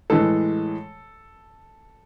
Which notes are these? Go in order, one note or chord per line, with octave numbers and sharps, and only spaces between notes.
A2 E3 G#3 A4